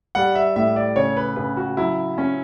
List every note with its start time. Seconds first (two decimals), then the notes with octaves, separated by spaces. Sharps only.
0.15 G3 F#5
0.35 E5
0.56 A2 E5
0.76 D5
0.96 C#3 C#5
1.17 B4
1.36 C#3 B4
1.57 F#4
1.77 F#3 E4
2.18 C#4